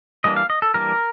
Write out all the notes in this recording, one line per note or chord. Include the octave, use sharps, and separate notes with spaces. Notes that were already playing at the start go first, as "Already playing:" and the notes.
E3 G3 A#3 D4 D#5
F5
D#5
A4
E3 G3 A#3 D4 A#4